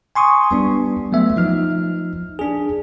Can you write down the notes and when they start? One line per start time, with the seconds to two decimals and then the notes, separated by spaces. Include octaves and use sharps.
0.15 G#5 C6 C#6 D#6
0.51 G3 B3 D4
1.12 F#3 A3 B3 E5
1.36 F3 D#4 F6
2.39 D4 G#4